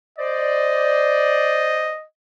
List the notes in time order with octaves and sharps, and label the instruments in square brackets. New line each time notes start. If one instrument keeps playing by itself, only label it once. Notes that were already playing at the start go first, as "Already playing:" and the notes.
[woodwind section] C5 D5 [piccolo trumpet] D#5